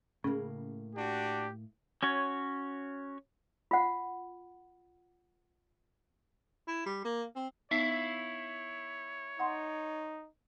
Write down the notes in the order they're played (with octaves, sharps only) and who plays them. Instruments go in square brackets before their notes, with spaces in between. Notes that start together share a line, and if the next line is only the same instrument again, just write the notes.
[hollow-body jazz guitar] A2 A#3 [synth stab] C#3
[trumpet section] D4 F#4 [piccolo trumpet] G4
[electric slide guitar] C#4 F#4 C#5
[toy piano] F4 F#5
[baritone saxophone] E4
G3
A#3
C4
[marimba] B3 D#4 [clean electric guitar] E4 E5 F5 [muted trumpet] C#5
[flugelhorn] D#4 [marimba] F#5 C6